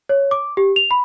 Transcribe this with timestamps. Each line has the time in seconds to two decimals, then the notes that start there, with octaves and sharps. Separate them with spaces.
0.09 C#5
0.31 D6
0.57 G4
0.76 F7
0.91 B5